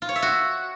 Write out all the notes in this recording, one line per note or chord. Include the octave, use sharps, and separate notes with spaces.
F4
C#5
E5
F#4